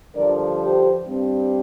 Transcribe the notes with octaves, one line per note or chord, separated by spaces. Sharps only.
G2 D3 F3 A#4 D5
G4 C5
G2 G3 C4